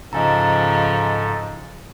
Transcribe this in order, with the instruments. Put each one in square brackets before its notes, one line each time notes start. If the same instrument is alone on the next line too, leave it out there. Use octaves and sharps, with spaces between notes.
[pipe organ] G#2 A4 [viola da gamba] C#3 F3 [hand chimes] D#5 G#5 A#5